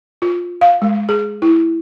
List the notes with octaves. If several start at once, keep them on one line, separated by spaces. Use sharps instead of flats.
F4
F5
G#3
G#4
E4